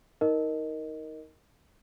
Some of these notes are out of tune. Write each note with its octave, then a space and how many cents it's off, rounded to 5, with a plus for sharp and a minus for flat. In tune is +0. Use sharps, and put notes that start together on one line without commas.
D#4 +25 A#4 +0 D#5 +0